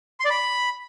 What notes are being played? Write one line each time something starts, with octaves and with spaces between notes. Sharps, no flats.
C6
D5
B5